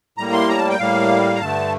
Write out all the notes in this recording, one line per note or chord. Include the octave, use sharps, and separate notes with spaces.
A2 G3 A#3 A#5
C6
A#5
A5
G5
A2 G3 A#3 F5
A#5
G2 D3 A3 A5